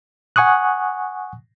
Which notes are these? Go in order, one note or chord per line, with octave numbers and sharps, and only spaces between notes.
F#5 G#5 C#6 D#6 F#6